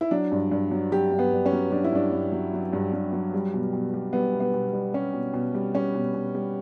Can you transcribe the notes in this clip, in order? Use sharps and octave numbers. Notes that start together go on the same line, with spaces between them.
E4
F#3 D4
G2
G2
F#3
F#3 G4
G2
B3
G2
C#4
F#3
F#3 D4
E4
G2 D4
G2
F#3
F#3
G2
G2
F#3
G3
B2
B2
G3
G3 B3
B2
B3
B2
G3
G3 C#4
B2
B2
G3
G3 C#4
B2
B2
G3